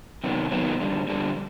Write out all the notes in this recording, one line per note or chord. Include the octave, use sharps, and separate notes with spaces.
C3 D#3 F#3 B3
C3 D#3 F#3 B3
F2 D3 G3
F2 D3 G3